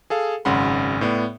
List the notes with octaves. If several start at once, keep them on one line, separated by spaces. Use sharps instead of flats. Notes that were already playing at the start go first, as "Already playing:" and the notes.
G#4 A4 F5
G#1 F#2 C#3 F#5 B5 C6
A2 B3 D5